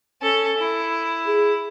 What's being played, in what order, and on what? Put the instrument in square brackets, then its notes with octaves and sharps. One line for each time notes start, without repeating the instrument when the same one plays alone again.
[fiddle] C#4 A4
E4
[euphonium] G#4